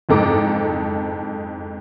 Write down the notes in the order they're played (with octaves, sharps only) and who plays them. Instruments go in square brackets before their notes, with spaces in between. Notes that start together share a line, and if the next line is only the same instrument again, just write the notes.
[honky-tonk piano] F#1 F2 G#2 A4 A#5 D6